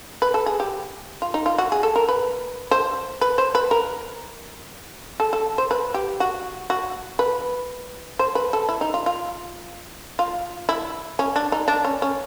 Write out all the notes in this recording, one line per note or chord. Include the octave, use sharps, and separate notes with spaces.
B4
A4
G#4
G4
F4
D#4
F4
F#4
G#4
A4
A#4
B4
C5
B4
C5
B4
A#4
A4
A4
C5
B4
G4
F#4
F#4
B4
C5
B4
A4
E4
D#4
F4
F4
F4
E4
C#4
D4
D#4
D4
C#4
C#4